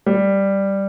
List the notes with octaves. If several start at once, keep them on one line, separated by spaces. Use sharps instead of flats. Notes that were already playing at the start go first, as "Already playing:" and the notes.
G3